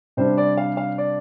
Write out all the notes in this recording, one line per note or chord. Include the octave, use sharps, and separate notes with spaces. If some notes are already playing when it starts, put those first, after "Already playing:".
C3 G3 D4 C5
D5
F5
F5
D5